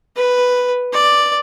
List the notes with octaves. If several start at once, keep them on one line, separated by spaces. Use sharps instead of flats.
B4
D5